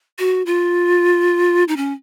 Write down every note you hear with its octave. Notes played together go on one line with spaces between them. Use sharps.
F#4
F4
D#4
C#4